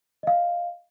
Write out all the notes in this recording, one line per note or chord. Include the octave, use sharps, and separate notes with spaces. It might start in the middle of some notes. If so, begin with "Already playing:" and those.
D#5 F5